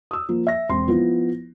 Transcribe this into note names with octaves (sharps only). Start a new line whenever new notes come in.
D#6 E6
F3 A#3
E5 A#6
E1 C4 C6
F3 B3 E4 F4